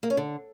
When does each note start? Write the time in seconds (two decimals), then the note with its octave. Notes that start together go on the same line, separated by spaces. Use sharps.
0.03 A#3
0.10 C#4
0.17 D3